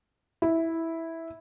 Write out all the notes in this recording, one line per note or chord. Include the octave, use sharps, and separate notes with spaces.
E4